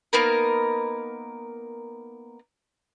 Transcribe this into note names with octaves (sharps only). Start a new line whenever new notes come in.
A#3 B3 D#4 A#4